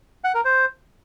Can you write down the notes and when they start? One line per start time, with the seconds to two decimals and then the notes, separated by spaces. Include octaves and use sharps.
0.24 F#5
0.35 A#4
0.45 C5